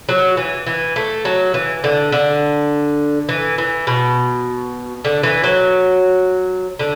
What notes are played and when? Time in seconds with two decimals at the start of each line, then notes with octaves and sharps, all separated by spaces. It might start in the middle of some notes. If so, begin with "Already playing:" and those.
0.09 F#3
0.37 E3
0.67 E3
0.96 A3
1.25 F#3
1.54 E3
1.84 D3
2.12 D3
3.29 E3
3.58 E3
3.87 B2
5.05 D3
5.23 E3
5.44 F#3
6.79 D3